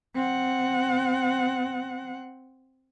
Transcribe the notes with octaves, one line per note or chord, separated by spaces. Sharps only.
C4 F#5